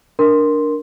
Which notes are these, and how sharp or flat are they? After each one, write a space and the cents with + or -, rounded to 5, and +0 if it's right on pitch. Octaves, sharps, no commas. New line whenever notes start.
D4 +0 A#4 +5 C6 +0